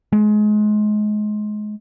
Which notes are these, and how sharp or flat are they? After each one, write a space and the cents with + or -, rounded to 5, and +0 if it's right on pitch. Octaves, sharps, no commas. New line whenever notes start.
G#3 +25